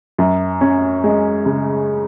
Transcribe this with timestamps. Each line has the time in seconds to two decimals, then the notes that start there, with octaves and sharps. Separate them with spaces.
0.18 F#2
0.61 C#4
1.04 G#3
1.46 C#3